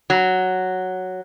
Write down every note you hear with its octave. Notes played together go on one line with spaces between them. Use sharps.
F#3